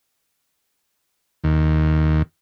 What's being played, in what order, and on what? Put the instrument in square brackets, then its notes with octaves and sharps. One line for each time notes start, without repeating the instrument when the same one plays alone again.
[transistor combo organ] D#2